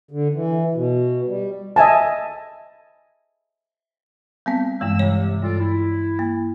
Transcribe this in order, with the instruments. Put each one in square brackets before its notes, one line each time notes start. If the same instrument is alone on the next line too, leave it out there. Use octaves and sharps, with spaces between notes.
[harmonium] D3
E3
B2
G3
[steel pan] D#5 E5 G#5 A5
[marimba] G3 B3 C4
[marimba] G2 E3 G#3 [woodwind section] E6
[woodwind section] C3 G3 [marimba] C#5
[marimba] G2 [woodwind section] F4 A4 D5
[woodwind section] E4
[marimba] A#3